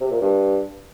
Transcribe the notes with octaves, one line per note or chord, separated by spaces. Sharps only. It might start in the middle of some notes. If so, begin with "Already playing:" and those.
C3
A#2
G2